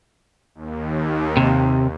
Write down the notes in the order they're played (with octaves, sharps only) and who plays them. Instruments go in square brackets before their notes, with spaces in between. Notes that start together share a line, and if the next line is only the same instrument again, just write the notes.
[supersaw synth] D#2
[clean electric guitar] C3